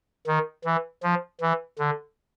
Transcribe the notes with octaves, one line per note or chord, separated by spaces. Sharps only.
D#3
E3
F3
E3
D3